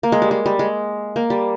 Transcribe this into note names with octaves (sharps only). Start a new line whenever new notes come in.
A#3
G#3
G3
G#3
G3
G#3
A#3
G3